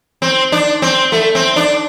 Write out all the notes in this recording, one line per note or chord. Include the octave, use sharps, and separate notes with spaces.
C4
D4
C4
A3
C4
D4